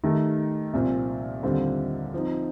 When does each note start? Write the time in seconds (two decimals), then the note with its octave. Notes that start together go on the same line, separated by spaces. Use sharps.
0.03 D#3 A3 D#4 G4 A#4
0.73 C2 A#2 F3 C4
1.43 D#2 D3 G3 C4 F4
2.13 F3 C4 D#4